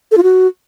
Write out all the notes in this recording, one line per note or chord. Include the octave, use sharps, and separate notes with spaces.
A4
F4
F#4